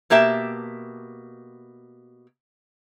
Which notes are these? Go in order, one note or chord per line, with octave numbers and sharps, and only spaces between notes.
B2 A#3 G4 E5 A5